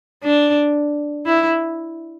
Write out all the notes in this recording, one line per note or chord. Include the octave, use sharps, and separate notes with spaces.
D4
E4